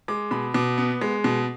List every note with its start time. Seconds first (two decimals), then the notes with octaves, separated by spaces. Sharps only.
0.08 G#3 D6
0.31 B2 B5
0.54 B2 D6
0.78 B3
1.01 G#3
1.24 B2